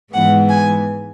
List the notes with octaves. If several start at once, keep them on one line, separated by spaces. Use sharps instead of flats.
G#2 E3 G#3 B3 F#5
G#5